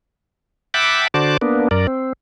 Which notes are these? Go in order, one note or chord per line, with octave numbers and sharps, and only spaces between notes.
E5 F#5 G5 A5 B5 D6
D3 F#4 C5 D5 A5 D6
A#3 B3 D4
F#2 A#4 D5
C4